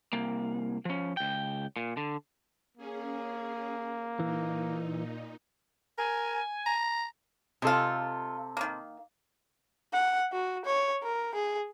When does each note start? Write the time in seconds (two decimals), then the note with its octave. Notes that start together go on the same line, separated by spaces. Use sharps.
0.13 C2 A#3
0.85 F3 C#4
1.17 C#2 G5
1.76 A#2
1.97 D3
2.77 A#3 C#4 G#4
4.20 A#2 E3 D#4
5.98 A#4 G#5
6.66 A#5
7.62 C3 G#3 F4 A4
8.57 D#3 A#3
9.93 F#5
10.32 F#4
10.65 C#5
11.03 A#4
11.35 G#4